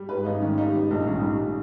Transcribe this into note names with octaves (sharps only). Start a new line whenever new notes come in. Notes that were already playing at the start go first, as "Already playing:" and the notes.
Already playing: G3
G#2 B4
G#1 D#4
D#3 C#4
G3 D#4
G#2
A#1 D#4
C#4
D#3
G3 C#4